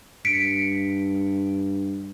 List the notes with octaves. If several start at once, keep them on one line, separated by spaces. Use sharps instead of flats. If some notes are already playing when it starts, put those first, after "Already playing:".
G2 B6 C#7 D7